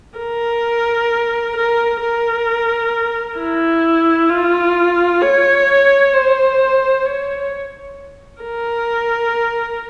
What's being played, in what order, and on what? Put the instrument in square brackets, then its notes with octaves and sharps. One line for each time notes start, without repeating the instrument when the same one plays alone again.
[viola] A#4
A#4
A#4
E4
F4
C#5
C5
C#5
A#4